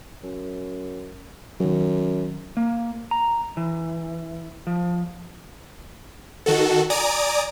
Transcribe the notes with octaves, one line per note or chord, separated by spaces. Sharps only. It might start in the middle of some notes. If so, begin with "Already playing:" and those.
F#2
F#2 D#3 F#3
A#3
A#5
E3
F3
D#3 F#4 A4
D5 G#5 A#5 D#6 D7